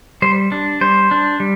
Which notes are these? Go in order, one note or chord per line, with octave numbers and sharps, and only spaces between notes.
G3 C5
D4
G3 C5
D4
G3